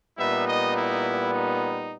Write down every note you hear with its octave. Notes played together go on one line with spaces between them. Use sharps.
A#2 G3 B3 D#4 E5
D#5
E4
D#4